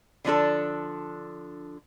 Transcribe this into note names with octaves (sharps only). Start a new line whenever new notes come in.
D3 F3 D4 A4